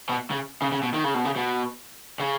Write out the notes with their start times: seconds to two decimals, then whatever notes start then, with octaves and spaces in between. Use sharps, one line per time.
0.09 B2
0.30 C#3
0.62 C#3
0.72 C#3
0.83 B2
0.94 D#3
1.04 C#3
1.14 B2
1.25 C#3
1.36 B2
2.20 C#3